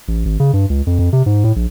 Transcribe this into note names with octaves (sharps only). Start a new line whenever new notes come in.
A1
G#1
C#3
G2
C#2
F2
F2
C3
G#2
A2
A#1